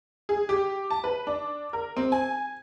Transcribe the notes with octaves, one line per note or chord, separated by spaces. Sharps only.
G#4
G4
A5
B4
D4
A#4
C4
G#5